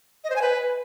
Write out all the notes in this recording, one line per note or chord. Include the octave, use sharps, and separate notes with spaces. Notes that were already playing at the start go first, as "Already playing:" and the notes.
D#5
C5
G#5
B4